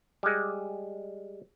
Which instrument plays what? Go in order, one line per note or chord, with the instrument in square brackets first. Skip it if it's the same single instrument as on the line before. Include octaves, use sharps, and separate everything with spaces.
[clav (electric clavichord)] G3 G#3